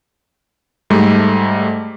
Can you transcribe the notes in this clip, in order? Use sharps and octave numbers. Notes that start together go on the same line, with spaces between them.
G#2 G3 A3